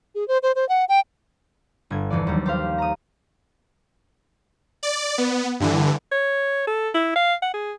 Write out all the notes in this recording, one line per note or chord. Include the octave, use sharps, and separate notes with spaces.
G#4
C5
C5
C5
F#5
G5
G1 G#6
F1 E2 E3 D5
D#2 F#3 G3
G4 C5 F5
A#5 D#6
D5
B3
G2 D3 E3
C#5
A4
E4
F5
F#5
G#4